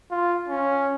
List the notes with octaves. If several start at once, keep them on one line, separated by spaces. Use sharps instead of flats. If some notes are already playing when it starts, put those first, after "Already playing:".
F4
C#4